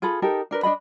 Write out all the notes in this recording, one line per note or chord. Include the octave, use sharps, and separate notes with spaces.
F4 G#4 A4 B5
D#4 G4 A4 A#4
D4 A#4 B4
D4 F4 D#5 B5